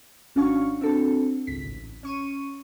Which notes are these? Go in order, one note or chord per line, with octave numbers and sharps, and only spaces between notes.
G#1 C#4 D4 F#4 F5 C#6
C4 D4 F#4 A4
G#1 C#2 B6
A1
C#4 C#6 D#7